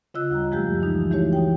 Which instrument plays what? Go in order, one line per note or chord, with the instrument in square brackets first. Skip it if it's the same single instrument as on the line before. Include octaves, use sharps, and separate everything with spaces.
[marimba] C#3 F4 D#5 E6 F#6
D2 G3 A#5
F#2 F3 G#3 A3 G4 G6
E3 D#4
E3 A3 E4 F#4 G4 C#5
D#4 G5